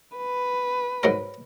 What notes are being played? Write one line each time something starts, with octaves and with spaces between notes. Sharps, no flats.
B4
G#2 F#3 A#4